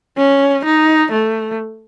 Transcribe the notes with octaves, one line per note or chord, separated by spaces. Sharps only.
C#4
D#4
A3